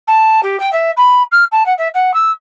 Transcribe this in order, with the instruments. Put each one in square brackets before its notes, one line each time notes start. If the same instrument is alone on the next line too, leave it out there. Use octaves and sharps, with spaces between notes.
[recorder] A5
G4
G5
E5
B5
F6
A5
F#5
E5
F#5
E6